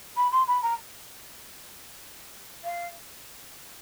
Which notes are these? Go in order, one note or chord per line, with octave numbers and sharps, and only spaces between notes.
B5
C6
B5
A#5
F5